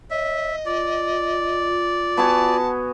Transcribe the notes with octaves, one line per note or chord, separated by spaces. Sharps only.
C#5 D#5 E5
F4 D5
B3 F#4 G#5 A5